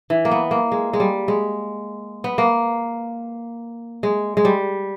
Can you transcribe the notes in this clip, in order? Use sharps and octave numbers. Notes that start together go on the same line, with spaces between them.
E3
A#3
B3
A#3
G#3
G#3
G3
G#3
B3
A#3
G#3
G#3
G3